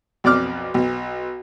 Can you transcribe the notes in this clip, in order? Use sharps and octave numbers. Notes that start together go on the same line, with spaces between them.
B1 F2 D5 D6 F6
B1